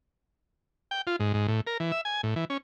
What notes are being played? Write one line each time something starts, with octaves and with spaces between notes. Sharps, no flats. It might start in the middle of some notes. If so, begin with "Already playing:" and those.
G5
F4
G#2
G#2
A2
A#4
E3
E5
G#5
A2
E3
C#4